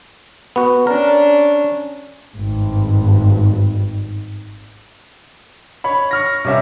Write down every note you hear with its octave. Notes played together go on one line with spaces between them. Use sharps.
B3 F#4
C#4 D4 A#4
G#1 G2
C#5 B5
C#6 F6 A#6
C3 G3 C#4 E5